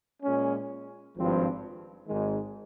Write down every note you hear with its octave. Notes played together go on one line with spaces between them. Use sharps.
A#2 G#3 C#4
G#1 G2 F3 C4
G#1 G#2 D#3 G#3